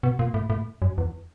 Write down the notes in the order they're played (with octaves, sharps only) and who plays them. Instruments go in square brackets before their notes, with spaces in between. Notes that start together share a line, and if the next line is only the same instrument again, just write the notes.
[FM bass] B2
A#2
A2
A2
F#2
E2